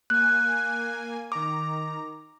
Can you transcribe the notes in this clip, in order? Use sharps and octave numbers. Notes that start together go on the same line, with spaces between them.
A#3 G#5 F#6
D#3 A#5 D6